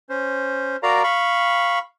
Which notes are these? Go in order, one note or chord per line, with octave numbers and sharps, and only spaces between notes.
C#4 C5
F#4 A#4 D5 F5 A#5
F5 B5 C#6